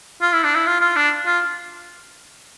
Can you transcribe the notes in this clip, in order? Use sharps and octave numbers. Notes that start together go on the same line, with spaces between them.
F4
E4
D4
E4
F4
F4
D4
F4